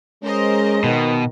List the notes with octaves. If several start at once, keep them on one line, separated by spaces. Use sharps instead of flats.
G#3 C#4 A#4 C5 D#5
B2 D#3